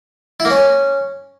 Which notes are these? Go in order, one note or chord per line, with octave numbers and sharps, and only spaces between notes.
E4
A#3
C#4